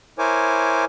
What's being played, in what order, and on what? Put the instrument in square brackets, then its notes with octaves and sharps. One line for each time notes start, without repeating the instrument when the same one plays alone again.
[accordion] E4 A#4 C5 C#5 G#5 D6